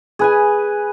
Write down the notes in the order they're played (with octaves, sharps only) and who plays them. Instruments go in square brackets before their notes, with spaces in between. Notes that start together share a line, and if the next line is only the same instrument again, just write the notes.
[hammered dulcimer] G#4 B4 G#5